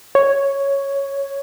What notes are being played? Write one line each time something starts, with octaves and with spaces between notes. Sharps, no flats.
C#5